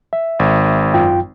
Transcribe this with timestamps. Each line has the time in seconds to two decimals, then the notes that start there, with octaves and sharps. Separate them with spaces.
0.13 E5
0.39 G#1
0.94 F#2 F4 G5